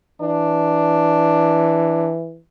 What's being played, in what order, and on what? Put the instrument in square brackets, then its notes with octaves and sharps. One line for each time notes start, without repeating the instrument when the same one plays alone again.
[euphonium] E3 [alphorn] D4